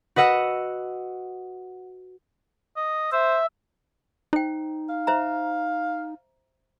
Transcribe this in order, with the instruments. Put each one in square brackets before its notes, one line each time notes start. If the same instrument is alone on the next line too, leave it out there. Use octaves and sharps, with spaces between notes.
[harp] F#4 B4 D#5 F#5 E6
[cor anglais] D#5
[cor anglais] C5 [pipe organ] E5
[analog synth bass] D#4 [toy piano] C5 G5
[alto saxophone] F5
[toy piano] C5 E5 A#5